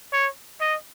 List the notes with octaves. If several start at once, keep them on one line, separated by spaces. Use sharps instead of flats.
C#5
D#5